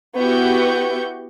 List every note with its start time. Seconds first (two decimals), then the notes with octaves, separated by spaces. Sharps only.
0.17 B3 E4 F#4 G4 C#6 G6